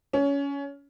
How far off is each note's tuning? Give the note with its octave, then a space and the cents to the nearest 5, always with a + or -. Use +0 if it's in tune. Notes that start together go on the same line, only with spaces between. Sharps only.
C#4 +20